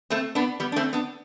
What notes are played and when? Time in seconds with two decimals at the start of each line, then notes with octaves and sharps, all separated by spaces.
0.10 A3 C4
0.35 B3 D4
0.60 G3 B3
0.72 D4
0.76 A3 C4
0.93 B3 D4